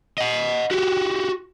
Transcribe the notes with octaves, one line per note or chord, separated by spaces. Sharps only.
D#5 F#5
F#4 G4